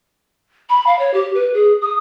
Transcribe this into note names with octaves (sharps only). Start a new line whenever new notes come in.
B5
F5
C#5
G4
B4
G#4
D#6